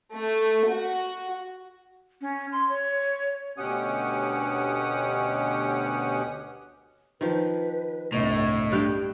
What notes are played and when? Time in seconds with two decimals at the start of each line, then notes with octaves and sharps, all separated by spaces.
0.14 A3
0.70 F#4
2.21 C#4
2.52 C6
2.69 C#5
3.58 D2 B2 C#4 G4 F#5 D#6
7.21 D#3 F3 B4
8.12 G1 C2 A2 D#5 F7
8.72 G2 F5 G5 F#6